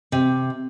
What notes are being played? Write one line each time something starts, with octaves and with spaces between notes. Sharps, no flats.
C3